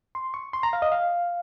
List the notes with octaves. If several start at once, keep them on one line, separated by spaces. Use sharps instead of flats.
C6
C#6
C6
A#5
F5
D#5
F5